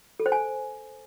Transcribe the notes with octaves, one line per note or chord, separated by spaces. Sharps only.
A4
C5
G#5